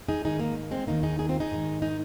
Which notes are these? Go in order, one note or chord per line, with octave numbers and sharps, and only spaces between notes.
D#4 G#4
G#2 D#3 D#4 G#4
A#3 D#4
G#3 C4
D#2 D#3 A#3 D#4
D#4 G#4
D#4 G#4
C4 F4
D#4 G#4
G#2 D#3
D#4 G#4